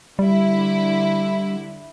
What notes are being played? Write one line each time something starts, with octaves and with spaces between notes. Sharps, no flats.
D3 G3 E4